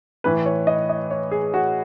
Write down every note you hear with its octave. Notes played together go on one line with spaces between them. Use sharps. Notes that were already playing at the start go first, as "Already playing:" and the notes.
A2 E3 B4
C#5
D#5
D#5
C#5
G#4
F#4